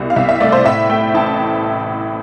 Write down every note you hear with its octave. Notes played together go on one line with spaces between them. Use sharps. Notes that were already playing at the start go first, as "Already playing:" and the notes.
Already playing: C2 B2 G3
F5
C2 E5
E5
A3 D5
C5
A2 E5
A3 G5
A1 A5